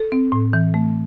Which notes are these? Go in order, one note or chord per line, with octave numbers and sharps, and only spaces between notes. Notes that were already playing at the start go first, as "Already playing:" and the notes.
Already playing: A4
C4
A2
E3
A3